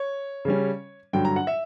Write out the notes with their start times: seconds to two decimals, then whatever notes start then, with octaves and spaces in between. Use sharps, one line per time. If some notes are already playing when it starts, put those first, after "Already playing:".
Already playing: C#5
0.45 C#3 G3 C#4
1.13 G2 D3 F#3 G5
1.25 A#5
1.36 F#5
1.47 E5